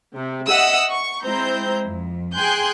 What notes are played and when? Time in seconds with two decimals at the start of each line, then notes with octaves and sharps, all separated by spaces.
0.16 C3
0.48 D#5 E5 F#5 D#6 E6
0.90 C#6
1.24 G#3 C4 E4 C5 A#5 G6
1.86 F2
2.35 G#4 G5 G#5 C6 F#6 G6